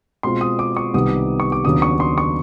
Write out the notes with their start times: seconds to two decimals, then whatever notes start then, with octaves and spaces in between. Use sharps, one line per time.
0.23 B2 G#3 C4 F4 C6
0.41 D#6
0.59 D6
0.77 C#6
0.94 C2 C3 D#3 G3 B3 D#6
1.40 C#6
1.52 D6
1.65 D#2 C#3 F#3 B3 D4 D#6
1.82 C#6
2.00 C6
2.18 C#6